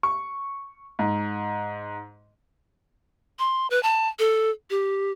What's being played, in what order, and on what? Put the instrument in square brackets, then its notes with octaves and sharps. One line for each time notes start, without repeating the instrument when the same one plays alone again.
[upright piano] C#6
G#2
[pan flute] C6
B4
A5
A4
G4